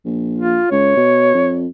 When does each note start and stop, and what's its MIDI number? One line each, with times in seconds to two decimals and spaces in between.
0.05 0.59 34
0.39 0.67 65
0.71 0.96 37
0.71 1.58 73
0.97 1.32 47
1.34 1.67 41